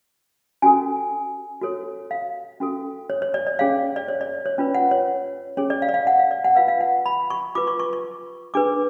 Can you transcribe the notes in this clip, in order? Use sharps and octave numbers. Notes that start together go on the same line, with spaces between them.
C#4 F#4 A4 G#5
F#4 A4 C#5
F5
C#4 F#4 A4
C#5
C#5
D5
D5
C#4 G#4 C#5 F5
D5
C#5
D5
C#5
C#4 F4 B4
F#5
C#5
C#4 G#4 C#5
D5
F5
D5
F5
F#5
F5
D5
F#5
F4 B4 F5
F5
F#5
B5
C#6
F4 B4 D6
C#6
C#6
C#6
D4 G#4 B4 D6